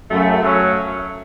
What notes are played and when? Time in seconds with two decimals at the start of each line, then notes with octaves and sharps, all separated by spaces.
0.10 F#2 C#3 F#3 A3
0.43 F#3 A3 C#4